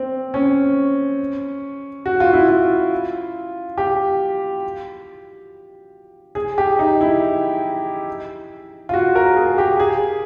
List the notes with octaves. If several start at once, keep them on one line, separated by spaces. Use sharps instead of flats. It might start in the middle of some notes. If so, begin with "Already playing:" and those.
Already playing: C4
C#4
F#4
F4
E4
F4
G4
G#4
G4
D#4
E4
F4
F#4
A#4
G#4
G4
G#4